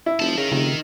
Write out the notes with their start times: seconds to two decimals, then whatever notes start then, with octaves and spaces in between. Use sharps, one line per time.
0.06 E4
0.20 F1 C5 A5
0.38 C#3 D#4 A#4
0.52 F1 C#3